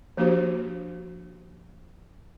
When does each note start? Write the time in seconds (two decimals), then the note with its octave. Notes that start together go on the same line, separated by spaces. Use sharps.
0.17 F3 A#3 D4 F#4 G4 C5